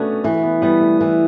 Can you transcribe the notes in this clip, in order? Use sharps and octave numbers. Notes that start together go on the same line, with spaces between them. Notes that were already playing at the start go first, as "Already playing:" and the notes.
Already playing: A3 B3 C#4 D4 F#4 A4
E3 A3
B3
G3 B3
A3
E3